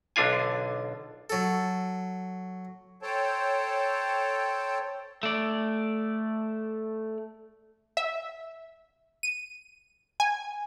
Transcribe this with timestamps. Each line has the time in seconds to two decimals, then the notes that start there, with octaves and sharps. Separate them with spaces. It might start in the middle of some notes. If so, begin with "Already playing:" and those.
0.16 B1 D3 D4 F4 G#5
1.30 F#3 A4
3.02 A4 C5 C#5 G5 A5
5.23 A3 D5
7.97 E5
9.23 D#7
10.20 G#5